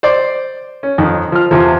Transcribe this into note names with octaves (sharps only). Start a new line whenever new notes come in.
C5 D5 D6
C#4
F2 D#3
F3 F6
E2 C3 F3